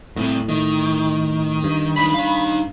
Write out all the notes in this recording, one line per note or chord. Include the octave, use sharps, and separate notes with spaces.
C2 A2 C3
A2 D#3
G2
F#2 D#3 B5
D#4 F5